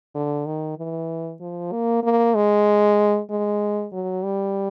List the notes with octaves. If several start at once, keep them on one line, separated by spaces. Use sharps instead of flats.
D3
D#3
E3
F3
A#3
A#3
G#3
G#3
F#3
G3